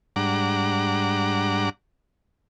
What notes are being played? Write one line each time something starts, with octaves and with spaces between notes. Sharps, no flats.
G#2 G3 D4 F#5 A#5 D6